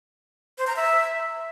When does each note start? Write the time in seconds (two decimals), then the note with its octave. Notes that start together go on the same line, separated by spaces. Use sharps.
0.58 C5
0.67 A#5
0.76 E5